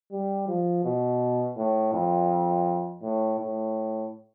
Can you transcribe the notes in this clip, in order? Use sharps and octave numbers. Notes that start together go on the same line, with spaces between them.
G3
F3
B2
A2
F2
A2
A2